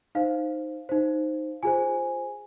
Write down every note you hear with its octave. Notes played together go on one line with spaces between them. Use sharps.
D#4 C5 F5
D#4 C5
F4 G#4 C5 G#5